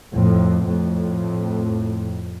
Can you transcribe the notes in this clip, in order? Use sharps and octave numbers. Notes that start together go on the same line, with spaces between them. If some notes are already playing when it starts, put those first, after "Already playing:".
F2 A2
F2 A2